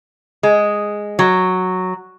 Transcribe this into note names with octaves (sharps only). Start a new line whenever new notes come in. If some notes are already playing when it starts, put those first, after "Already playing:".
G#3
F#3